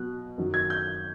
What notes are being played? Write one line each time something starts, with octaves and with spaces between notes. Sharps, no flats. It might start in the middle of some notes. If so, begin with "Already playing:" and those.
Already playing: B2 F#3 F#6
F#2 D#3 F#3
G#6
G6